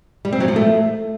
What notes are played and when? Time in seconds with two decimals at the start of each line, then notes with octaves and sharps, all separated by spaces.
0.25 G3
0.33 C4
0.40 F#3
0.48 F3
0.56 A3